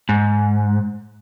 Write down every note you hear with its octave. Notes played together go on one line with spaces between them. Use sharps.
G#2